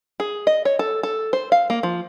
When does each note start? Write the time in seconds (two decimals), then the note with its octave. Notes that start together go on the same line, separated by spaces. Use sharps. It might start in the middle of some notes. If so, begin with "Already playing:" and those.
0.20 G#4
0.47 D#5
0.65 C#5
0.79 A4
1.03 A4
1.33 C5
1.52 F5
1.70 A#3
1.83 F3